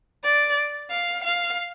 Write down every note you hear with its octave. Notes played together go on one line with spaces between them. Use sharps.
D5
F5
F5